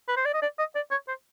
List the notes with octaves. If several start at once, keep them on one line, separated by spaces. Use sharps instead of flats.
B4
C5
D5
D#5
D5
D#5
D5
C#5
C5